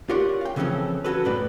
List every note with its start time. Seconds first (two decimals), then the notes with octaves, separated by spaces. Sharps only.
0.09 F4 G4 A#4 C#5 D5 F#5
0.41 F5 G5
0.56 C#3 E3 F3 C4 C#4 A4
1.04 C#4 F#4 A4 B4
1.25 F#2 A2 B3 B4 D5